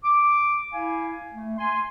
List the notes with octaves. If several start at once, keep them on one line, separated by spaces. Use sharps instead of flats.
D6
E4 F5 G#5
A3
G#5 C6